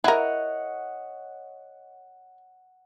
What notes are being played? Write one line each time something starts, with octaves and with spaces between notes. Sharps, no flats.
E4 A#4 C#5 D#5 F#5